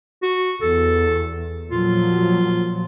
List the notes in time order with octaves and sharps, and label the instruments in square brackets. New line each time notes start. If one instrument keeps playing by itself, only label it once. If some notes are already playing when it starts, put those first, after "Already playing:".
[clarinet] F#4
[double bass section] E2 [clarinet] A4
[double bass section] A#2 F3 F#3 [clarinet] F4